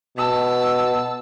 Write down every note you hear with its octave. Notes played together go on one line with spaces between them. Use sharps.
B2 A5 E6